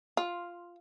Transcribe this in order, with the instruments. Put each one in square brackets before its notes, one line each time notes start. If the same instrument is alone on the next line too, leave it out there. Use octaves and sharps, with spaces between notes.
[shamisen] F4